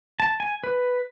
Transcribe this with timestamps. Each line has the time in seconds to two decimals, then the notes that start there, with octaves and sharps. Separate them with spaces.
0.20 A5
0.40 G#5
0.64 B4